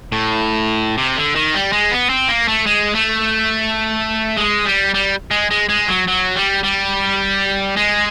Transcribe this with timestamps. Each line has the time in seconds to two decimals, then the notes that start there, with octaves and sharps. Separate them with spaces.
0.12 A2
0.97 C3
1.16 D3
1.35 D#3
1.54 G3
1.73 G#3
1.92 B3
2.10 C4
2.29 A#3
2.48 A3
2.67 G#3
2.95 A3
4.37 G#3
4.65 G3
4.94 G3
5.31 G#3
5.51 G#3
5.69 G#3
5.88 F#3
6.07 F#3
6.36 G3
6.63 G3
7.76 G#3